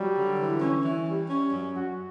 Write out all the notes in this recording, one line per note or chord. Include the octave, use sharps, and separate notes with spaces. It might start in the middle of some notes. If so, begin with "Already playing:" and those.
Already playing: F#3 G3
D3
E3
C#4
E3
G3
C#4
F#2
F#2 F#4